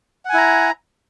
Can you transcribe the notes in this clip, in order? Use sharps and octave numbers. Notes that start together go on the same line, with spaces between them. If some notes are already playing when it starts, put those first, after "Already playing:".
E4 F#5 G#5 A#5